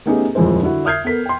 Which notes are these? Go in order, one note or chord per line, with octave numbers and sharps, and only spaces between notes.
A3 B3 C#4 D#4 G4 G#4
D#1 F2 F3 G#3 E4 C5
D3 E4 F#4
E5 D#6 F6 G6 G#6 C7
B3 A4 A#4 B6
G5 C6